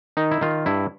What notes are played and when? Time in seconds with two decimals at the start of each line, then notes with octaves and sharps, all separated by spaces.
0.17 D#3 D#4
0.31 E4
0.41 D#3 F4
0.66 G2 E4